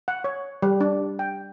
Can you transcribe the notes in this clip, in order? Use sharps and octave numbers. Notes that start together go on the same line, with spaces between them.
F#5
C#5
G3
D4
G5